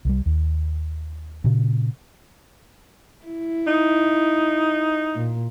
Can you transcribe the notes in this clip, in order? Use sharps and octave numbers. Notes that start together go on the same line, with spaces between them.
C2 F3 G3
D#2
A#2 C#3
E4
D#4
A#2